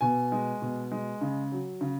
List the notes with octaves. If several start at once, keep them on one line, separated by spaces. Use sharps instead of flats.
B2 G#5
G#3
B2
G#3
C#3
F#3
C#3